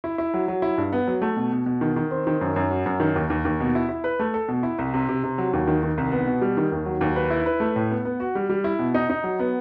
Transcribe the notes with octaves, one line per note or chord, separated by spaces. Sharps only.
E4
E4
F#3
F#3
E4
G2
B3
F#3
A3
B2
B2
B2
D#3
D#3
C4
D#3
F#2
F#2
F#3
F#2
D#3
D#2
D#2
D#2
B2
E4
E4
B4
A3
A4
B2
E4
C2
C3
C3
C3
F#3
D#2
D#3
D#3
C2
B3
B2
G3
D#3
D#2
F#3
D#2
B4
E4
B4
A3
A2
B3
B3
F#4
G3
G3
E4
B2
D#4
D#4
F#3
B3